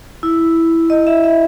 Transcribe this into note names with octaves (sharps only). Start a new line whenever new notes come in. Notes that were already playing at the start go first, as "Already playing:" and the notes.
E4
D#5
E5
E5